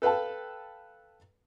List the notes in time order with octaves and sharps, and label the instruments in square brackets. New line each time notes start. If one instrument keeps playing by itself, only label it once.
[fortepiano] A4 B4 F5 G5 A5